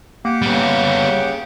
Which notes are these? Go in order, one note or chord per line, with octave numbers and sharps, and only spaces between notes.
A#3 G4 F#5 D6
C#3 G3 B3